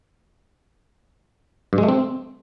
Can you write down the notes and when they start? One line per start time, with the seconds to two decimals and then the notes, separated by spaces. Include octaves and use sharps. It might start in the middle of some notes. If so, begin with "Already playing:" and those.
1.73 G2
1.78 G#3
1.83 A3
1.89 C4